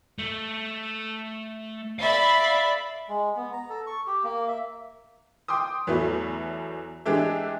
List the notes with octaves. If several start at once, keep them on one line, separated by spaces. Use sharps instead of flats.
A3
D5 E5 F5 B5
G#3
B3
A#5
A4
C#6
G4
A#3
E5
G5 C6 D6 D#6
E2 F#3 A3 B3 E4
E3 G#3 D4 G4 E5